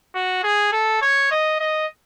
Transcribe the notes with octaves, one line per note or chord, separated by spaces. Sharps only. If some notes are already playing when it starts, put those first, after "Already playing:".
F#4
G#4
A4
C#5
D#5
D#5